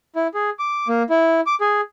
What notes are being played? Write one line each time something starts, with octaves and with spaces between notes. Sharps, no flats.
E4
G#4
D6
A#3
E4
D6
G#4